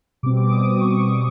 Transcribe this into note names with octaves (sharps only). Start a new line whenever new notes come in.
B2 G3 C4 D6
D6
D6
D#6
D6
C#6